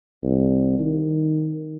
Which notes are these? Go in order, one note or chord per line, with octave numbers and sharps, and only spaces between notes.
C2
D#3